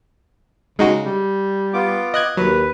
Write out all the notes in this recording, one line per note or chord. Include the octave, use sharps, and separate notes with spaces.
C#3 G#3 D#4 F#4
G3
B3 F4 D6
D#5 F#6 G#6
D#2 F#3 B4